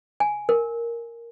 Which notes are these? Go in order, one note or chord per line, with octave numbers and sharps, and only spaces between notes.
G#5
A#4